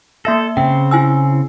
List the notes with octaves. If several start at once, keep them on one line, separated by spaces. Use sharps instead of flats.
A#3 A4 E5 A#6
C#3 C4 G5
E4 G#5 E6